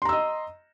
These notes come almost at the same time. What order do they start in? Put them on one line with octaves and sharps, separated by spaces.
C6 A#5 E6 D#5